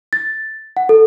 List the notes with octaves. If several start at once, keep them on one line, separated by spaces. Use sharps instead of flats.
A6
F#5
A4